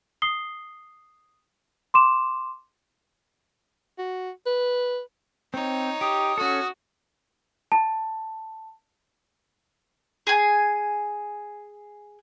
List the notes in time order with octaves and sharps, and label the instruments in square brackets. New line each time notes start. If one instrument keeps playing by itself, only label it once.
[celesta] D#6 C7 G7
C6 D6 E7
[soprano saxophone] F#4
B4
[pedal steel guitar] C4 [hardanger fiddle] D#4 C#5
[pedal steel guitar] G4 [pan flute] D#6
[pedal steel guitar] C#4 A4 [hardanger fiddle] F#4
[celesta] A5
[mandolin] G#4 G#5